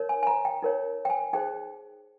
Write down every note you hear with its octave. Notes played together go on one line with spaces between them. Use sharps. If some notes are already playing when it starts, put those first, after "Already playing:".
Already playing: D#4 A#4 C#5
G#5
G#5
A#5
G5
D#4 A#4 C#5
G5
G#5
D#4 G#4 C5 G5